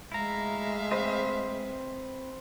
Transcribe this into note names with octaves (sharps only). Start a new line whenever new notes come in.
G#3 A3 E4 E5 F5 A#5
C4 B4 C5 D#5